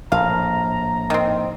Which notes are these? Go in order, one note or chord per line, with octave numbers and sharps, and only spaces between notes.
A#1 A2 F5 A#5
D#3 C4